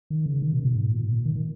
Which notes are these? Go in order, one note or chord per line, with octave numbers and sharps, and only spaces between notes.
D#3
C#3
D#3
B2
C#3
B2
G#2
A#2
A#2
D#3
D#3